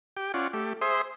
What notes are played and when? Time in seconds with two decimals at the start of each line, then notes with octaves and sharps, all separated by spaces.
0.17 G4 G5
0.34 C#4 F4 D5 F#5
0.53 A3 G4
0.81 G#4 C5 E5 C6 D#6